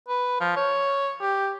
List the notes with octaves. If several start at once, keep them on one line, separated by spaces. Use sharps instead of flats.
B4
F3
C#5
G4